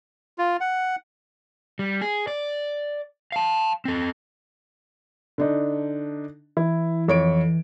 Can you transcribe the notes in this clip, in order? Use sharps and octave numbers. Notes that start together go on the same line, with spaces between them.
F4
F#5
G3
G#4
D5
F5 A5
C4 A4
D3 D4 D#4
E3 E4
F2 C#5 D7